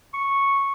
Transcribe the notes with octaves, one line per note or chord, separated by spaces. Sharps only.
C#6